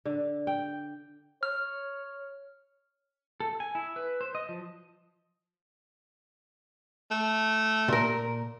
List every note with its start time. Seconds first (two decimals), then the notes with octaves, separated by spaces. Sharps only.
0.05 D3
0.47 G5
1.43 C#5 F6
3.40 A4
3.60 G#5
3.75 E4
3.96 B4
4.21 C5
4.35 D#5
4.49 F3
7.11 A3
7.88 A#2 A#4